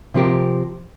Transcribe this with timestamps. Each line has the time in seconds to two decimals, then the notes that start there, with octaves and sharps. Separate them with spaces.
0.14 C3 F3 C4 G4 A#4